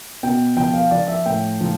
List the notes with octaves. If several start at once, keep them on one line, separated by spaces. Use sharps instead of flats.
B2 G5
F3 G5
F5
F3 D5
E5
A2 G5
F3